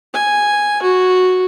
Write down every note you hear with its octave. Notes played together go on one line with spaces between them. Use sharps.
G#5
F#4